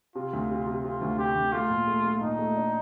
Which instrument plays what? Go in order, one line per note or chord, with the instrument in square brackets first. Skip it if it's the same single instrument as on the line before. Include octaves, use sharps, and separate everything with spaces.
[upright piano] C3 [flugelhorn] F4
[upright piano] D2
C3
C3
[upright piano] C3 [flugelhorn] F4
[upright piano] D2
[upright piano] C3 [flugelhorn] G4
[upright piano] D2
[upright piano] A3 [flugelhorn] F4
[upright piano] A#2
A3
A3
[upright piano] A#2 [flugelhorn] D#4
[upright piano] A3
D4